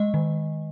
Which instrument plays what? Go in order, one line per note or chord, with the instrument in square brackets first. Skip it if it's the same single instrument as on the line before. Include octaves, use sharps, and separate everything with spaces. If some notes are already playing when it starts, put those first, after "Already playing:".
Already playing: [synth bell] G#3 D#5
D#3